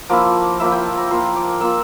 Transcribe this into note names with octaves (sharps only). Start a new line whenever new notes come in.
F3 A#3 E4 D6
F3 A#3 E4 E5
G5
A5
A#5
A#3 F4 C6
D6
A#3 F4 E6